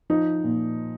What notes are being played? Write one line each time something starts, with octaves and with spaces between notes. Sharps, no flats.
F3 D#4
A#2